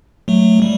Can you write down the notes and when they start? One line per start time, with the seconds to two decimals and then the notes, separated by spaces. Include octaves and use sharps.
0.28 F#3 A3
0.62 G3